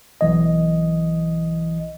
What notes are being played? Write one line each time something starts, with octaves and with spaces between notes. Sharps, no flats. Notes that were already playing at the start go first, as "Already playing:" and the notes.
B1 E3 D#5